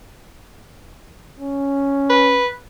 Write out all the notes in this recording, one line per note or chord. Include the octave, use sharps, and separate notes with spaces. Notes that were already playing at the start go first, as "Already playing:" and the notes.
C#4
B4